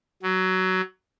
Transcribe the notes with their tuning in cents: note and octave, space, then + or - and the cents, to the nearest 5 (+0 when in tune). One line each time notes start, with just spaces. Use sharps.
F#3 +15